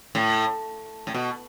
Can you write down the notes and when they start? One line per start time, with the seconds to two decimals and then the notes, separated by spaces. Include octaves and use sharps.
0.15 A2
1.07 A2
1.14 B2